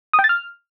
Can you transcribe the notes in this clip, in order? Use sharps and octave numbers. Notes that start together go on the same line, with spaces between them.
D#6
G5
A6
F6